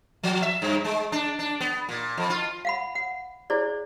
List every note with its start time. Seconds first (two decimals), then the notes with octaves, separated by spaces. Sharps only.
0.23 F3
0.42 E5
0.62 G2
0.85 G#3
1.12 D4
1.39 D4
1.61 B3
1.89 A#2
2.17 F2
2.30 F4
2.65 F5 F#5 B5
2.95 F#5
3.50 E4 G#4 C5 D5